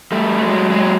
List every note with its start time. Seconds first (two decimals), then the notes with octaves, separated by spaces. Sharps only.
0.12 G3 A3
0.41 F#3 G#3
0.71 F#3 G#3